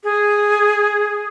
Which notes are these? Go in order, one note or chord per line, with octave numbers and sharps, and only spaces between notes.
G#4